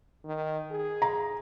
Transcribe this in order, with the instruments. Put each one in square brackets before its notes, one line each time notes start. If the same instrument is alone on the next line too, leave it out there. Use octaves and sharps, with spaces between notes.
[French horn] D#3
G#4
[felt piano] A#5